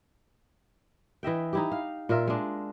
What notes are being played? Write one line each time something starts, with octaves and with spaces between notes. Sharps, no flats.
E3 D#5 E5 G5
D#4 E4 G4
F5
A#2 F4 A#4 E5
G#3 D4